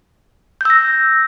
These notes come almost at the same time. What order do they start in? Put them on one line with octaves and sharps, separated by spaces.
G6 E6 A#6